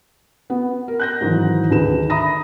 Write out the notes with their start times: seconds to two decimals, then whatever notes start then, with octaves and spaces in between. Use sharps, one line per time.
0.50 B3
0.88 A#4
1.00 F#6 G6 A#6
1.21 G#2 D#3 E3 F#3
1.71 D2 D#3 G#4 B4 E7
2.10 E5 A#5 B5 D#6 A#6